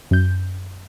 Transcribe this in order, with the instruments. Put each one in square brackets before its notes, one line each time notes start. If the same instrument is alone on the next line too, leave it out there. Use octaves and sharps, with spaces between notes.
[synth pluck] F#2 G6